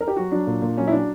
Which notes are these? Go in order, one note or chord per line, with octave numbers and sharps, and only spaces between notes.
A#4
G4
F#3 F#4
F#3 D4
A#2
A#2
F#3 C#4
E4
F#3 D4